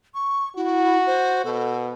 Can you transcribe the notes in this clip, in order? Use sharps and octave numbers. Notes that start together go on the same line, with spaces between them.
C#6
E4 F#4
C5
B2 A4